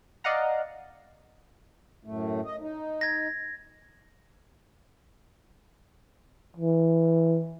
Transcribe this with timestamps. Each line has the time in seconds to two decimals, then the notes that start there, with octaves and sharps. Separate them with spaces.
0.24 D5 D#5 F5 F#5 A#5
2.04 F#2 A2 A3
2.45 D#5
2.60 D#4
3.01 G#6 A#6
6.57 E3